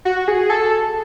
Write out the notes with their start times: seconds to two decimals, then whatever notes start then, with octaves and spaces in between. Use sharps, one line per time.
0.05 F#4
0.28 G#4
0.50 A4